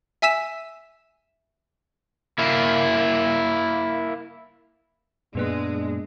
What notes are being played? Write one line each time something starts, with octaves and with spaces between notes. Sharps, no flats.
E5 G#5 E6 B6 E7
A#3 E4
F#2 A#2 G#3 A#3 B3 D4 B4 F#6